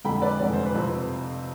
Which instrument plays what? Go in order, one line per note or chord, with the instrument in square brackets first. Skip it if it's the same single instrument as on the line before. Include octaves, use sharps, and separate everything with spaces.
[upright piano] F2 D3 G#3 G5 B5
B4 D5
F1 F2 D3 G#3 D5
C5
B4
F2 C3 F3 C4 C5